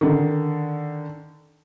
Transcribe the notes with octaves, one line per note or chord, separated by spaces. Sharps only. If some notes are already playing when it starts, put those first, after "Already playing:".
D3 D#3